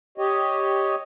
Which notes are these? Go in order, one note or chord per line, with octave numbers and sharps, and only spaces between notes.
G4 C#5 D#5